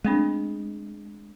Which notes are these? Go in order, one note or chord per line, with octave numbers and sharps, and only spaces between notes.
G#3 A3 C4 D4